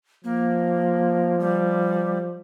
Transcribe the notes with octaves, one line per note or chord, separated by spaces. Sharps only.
F3 A#3
G3